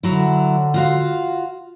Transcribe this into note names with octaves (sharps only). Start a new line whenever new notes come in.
D3 F#3 E4
F4 F#4 F5